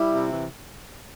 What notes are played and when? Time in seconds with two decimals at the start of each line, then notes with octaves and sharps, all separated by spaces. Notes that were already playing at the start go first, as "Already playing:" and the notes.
Already playing: G3 E4
0.12 C3
0.30 E3